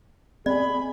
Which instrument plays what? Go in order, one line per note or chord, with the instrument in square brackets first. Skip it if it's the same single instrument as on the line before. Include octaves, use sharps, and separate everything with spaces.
[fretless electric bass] C4 [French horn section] G#4 [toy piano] D5 [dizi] B5